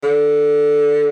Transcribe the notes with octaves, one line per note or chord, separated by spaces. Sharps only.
D3